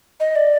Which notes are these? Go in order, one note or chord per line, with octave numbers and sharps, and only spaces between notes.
D#5
D5